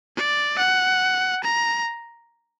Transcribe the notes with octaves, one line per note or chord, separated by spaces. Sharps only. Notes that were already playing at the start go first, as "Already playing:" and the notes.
D5
F#5
A#5